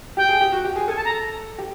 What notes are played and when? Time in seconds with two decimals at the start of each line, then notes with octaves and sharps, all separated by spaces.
0.17 G4 G5
0.29 G#4
0.41 G4
0.52 F#4
0.65 G4
0.76 G#4
0.88 A4 G#5
0.96 A5
1.05 A#5
1.58 G4